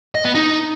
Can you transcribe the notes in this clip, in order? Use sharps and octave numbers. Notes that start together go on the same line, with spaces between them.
D#5
B3
D#4